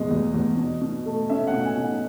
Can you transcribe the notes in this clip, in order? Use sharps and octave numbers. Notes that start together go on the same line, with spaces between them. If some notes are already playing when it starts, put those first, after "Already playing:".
Already playing: E2 B2 G#3 D#5
E2
E2
B2
B2
A3
C#4 E5
F#5
B2
G#5
B2
F#5